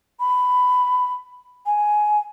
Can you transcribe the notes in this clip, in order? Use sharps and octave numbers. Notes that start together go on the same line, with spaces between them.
B5
G#5